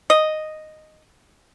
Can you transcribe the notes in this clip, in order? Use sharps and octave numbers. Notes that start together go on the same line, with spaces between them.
D#5